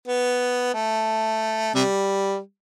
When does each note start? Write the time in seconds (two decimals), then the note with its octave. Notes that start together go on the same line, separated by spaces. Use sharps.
0.08 B3
0.74 A3
1.75 C3 G3